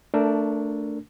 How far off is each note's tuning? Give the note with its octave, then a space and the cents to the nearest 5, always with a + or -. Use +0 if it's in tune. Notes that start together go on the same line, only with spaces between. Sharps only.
A3 +15 D4 -5 A#4 +0